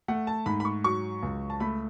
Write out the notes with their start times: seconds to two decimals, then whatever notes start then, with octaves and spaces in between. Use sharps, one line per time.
0.08 A3 F#5
0.27 A5
0.46 G#2 B5
0.60 B5
0.65 C#6
0.84 F#3 C#6
1.23 C#2
1.50 A5
1.60 A3 B5